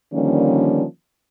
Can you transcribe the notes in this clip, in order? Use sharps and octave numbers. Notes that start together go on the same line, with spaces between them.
D3 D#3 F3 G3 A#3 C#4